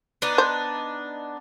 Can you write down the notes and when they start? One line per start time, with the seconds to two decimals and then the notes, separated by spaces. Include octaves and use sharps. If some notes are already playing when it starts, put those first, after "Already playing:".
0.22 B3 D4 D#4
0.38 C5